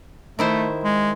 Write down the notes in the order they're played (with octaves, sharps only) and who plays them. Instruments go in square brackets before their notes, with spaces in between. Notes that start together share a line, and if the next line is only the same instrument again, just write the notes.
[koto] D#3 E4 C5 [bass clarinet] A3
[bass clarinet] G#3